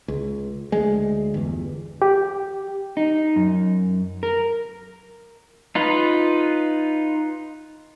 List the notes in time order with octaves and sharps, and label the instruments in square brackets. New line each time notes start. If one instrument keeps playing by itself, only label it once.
[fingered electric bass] C#2
D2 G#3
G1 E2
[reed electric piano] G4
[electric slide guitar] D#4
F#2
A#4
[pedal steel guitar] D#4 F4 B4